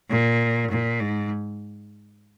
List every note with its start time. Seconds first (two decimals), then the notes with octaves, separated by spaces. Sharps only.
0.10 A#2
0.71 A#2
1.00 G#2